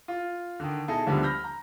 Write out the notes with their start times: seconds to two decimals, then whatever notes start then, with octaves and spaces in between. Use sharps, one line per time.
0.08 F4
0.60 D3 D#3
0.88 B2 D#4 E4 G#4 A4
1.07 D2 D3 F3 G3 B3
1.23 B5 F6 G6 A#6
1.44 A#5